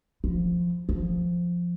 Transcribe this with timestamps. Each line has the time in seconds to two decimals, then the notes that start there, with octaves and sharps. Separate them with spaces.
0.24 F3
0.89 F3